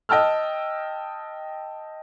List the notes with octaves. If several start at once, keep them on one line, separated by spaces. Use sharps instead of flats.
D#5 G5 A5 E6 F6